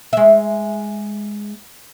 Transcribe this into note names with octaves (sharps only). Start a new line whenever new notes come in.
G#3 E5